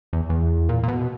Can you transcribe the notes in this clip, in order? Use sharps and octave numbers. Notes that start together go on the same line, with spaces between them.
E2
E2
A#2
A#2
B2